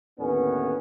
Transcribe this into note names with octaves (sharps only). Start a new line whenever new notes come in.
D#2 A2 D3 B3 C#4 B4